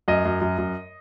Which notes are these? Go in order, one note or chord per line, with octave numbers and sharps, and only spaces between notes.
F#2 D#5
F#2
F#2
F#2